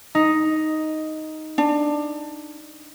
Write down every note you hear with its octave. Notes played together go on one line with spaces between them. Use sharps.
D#4
D4